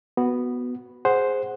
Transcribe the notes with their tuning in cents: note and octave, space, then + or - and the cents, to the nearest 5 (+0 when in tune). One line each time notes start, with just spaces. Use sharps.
B3 +0 F#4 +0
G#4 +0 C5 +0 F#5 +0